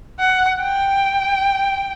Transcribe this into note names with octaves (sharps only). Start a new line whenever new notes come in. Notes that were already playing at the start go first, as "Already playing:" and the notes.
F#5
G5